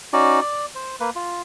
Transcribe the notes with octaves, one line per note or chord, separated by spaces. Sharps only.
C#4 D#4 F#4 D5
D5
C5
A#3 B4
F4